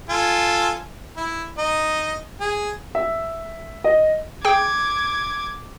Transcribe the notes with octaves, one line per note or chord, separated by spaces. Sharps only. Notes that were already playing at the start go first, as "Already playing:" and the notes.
F4 A4 G#5
E4
D#4 D#5
G#4
E5
D#5
G#4 G5 D6 G#6